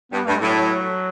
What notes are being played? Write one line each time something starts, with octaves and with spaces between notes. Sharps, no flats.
G2 B3
G2 A3
A2 F#3